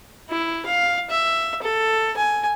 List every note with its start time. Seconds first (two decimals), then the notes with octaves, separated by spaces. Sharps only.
0.29 E4
0.66 F5
1.10 E5
1.62 A4
2.17 G#5